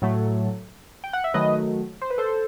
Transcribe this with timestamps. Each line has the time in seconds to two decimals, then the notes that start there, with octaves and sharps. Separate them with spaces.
0.02 A2 F#3 A3
1.04 G5
1.13 F#5
1.24 E5
1.34 D#3 F#3 A3 B4 D#5
2.01 C5
2.10 B4
2.18 A4 C5